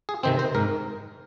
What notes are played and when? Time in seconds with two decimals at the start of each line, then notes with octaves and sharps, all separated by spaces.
0.09 G#4
0.23 C3 D#3 C4 C5
0.39 C5
0.55 G#2 A#4